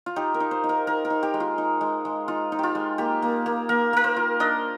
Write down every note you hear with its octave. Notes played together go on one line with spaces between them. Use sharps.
F4
D#4 G4
A#4
D#4
C5
D#4
A#4
D#4 A#4
A#4
D#4
G4
G#3
F4
D#4
G#3
G#3
D#4 F4
D#4
F4 G4
G#3
A#3 G4
A#3
A#3
A#3 A#4
A#3 A#4
C5
F4
D4 D#5